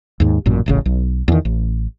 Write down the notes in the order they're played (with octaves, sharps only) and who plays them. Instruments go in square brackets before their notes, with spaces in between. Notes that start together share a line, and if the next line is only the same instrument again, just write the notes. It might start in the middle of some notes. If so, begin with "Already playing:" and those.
[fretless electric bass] D#2 G#2
A1 F#2 A#2
E1 A1 C#3
B1
E2 D#3
A1